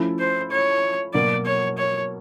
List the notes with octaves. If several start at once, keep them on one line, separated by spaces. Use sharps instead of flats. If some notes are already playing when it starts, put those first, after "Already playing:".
Already playing: F3 A3 C#4 E4
C5
C#5
B2 F#3 A#3 D5
C#5
C#5